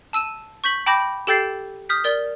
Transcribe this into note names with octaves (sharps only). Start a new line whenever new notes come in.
A5 E6 D#7 E7
C#6 G6 B6 F#7
G5 A5 B5 D6 G6 A#6
G4 A4 G5 G6 A6 C7
D#6 F6 G6 B6
A#4 D5 G7